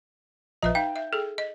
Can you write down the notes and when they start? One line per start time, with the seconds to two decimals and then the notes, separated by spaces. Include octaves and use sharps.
0.63 A#1 F3 B4 D#5 E5 A#5
0.75 D#4 F5 G5
0.96 E5
1.13 G#4 A4
1.38 D#5